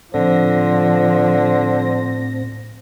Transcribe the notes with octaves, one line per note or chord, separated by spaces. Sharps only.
A2 D3 F3 C4 C5 A#6